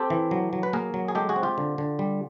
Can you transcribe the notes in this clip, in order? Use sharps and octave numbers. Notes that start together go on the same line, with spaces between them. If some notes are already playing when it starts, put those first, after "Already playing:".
Already playing: C4 G4 A4
E3
F#3
F#3
B4
A#3 G#4 A#4
F#3
G#4
G#3 G4 A4
F#4 G#4
C4
F4 G4
D3
D3
G3